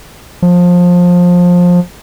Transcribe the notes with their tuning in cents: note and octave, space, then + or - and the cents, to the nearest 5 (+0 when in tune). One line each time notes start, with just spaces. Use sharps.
F3 +20